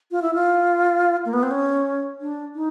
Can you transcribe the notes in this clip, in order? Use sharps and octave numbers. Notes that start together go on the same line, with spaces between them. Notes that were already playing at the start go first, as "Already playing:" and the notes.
F4
E4
F4
A#3
B3
C4
C#4
D4
D#4